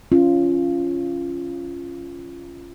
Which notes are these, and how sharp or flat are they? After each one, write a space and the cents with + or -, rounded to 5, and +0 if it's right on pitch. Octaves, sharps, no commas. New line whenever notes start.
C#4 +0 F4 -15